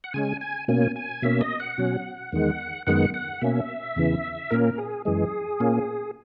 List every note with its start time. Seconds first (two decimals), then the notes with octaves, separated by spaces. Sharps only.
0.04 F#5
0.14 C#3 G#3 C#4 G#5
0.41 G#5
0.68 B2 A#3 C#4 G#5
0.96 G#5
1.22 B2 A#3 C#4 E5
1.41 D#5
1.60 F#5
1.78 B2 F#3 C#4
2.32 E2 D#3 G#3
2.87 F#2 D#3 G#3 B3 F#5
3.14 F#5
3.41 B2 A#3 C#4 E5
3.96 E2 C#3 E3
4.50 A#2 A#3 C#4 A#4
4.78 G#4
5.05 F#2 E3 G#3 G#4
5.60 A#2 A#3 C#4